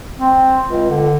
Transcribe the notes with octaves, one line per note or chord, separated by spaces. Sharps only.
C4
C#2
D3